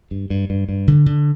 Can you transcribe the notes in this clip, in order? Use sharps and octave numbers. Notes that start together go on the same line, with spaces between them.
G2
G2
G2
G2
D3
D3